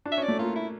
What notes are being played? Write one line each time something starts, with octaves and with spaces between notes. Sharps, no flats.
D4
E5
C#4
D5
A3
A#3 F4
E4